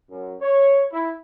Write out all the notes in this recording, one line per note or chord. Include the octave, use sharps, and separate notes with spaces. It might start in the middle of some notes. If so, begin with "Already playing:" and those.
F#2
C#5
E4